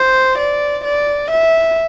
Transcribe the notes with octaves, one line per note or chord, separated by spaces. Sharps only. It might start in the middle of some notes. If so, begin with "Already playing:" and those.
Already playing: C5
D5
D5
E5